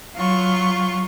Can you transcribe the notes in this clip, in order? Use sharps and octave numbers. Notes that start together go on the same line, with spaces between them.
F#3 F4 C#6